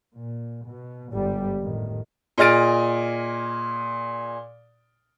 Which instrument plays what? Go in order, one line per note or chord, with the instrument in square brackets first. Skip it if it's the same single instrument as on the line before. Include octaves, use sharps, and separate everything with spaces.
[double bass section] A#2
B2
G1 G#2 G3
F2 A2 D#3
[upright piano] A#2 G#4 D#5 F6 A6 D7